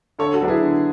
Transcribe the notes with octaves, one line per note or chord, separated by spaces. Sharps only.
D3 A4 C#5
F#4 A4
F#3 B3 D4
E4 G#4
D3